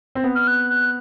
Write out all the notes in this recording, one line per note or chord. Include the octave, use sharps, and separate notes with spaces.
C4
B3
F6
F#6
F#6